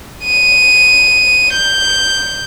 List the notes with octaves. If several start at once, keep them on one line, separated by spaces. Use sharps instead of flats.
D#7
G6